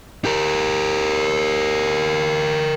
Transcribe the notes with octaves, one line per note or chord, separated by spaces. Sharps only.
G4 A#4